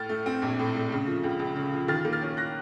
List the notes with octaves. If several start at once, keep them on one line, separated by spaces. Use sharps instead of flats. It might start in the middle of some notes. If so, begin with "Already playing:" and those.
Already playing: A2 F6 A6
A3
C4
A#1
A2
A3
C#3
F3
C#2
C#2
C#3
F3
D#3 F6 A6
A#3
F6 A6
C#4
F#6 A#6